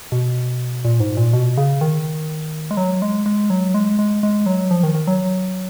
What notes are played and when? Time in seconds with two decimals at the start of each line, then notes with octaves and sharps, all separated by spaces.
0.12 B2
0.85 A#2
1.00 G#2
1.17 A#2
1.33 B2
1.58 C#3
1.81 D#3
2.71 G#3
2.77 F#3
3.02 G#3
3.26 G#3
3.50 F#3
3.74 G#3
3.99 G#3
4.23 G#3
4.46 F#3
4.71 F3
4.83 D#3
4.95 D#3
5.07 F#3